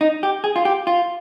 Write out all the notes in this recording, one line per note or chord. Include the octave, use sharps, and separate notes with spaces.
D#4
G4
G#4
F4
G4
F4